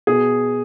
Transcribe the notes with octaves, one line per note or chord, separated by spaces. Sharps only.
B2 G#4